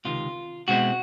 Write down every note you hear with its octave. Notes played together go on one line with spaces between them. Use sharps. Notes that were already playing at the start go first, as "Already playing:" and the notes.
C#2 C3 D#3 F4
B2 G#3 C4 E4 F#4